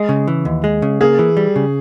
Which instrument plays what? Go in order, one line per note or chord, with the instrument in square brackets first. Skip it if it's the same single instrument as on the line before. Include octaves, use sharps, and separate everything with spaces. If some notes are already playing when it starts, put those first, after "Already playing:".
Already playing: [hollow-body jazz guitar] G#3
C#3
E3
D#2
G#3
C#3
[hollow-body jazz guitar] A#3 [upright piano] G#4
[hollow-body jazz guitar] E3
G3
C#3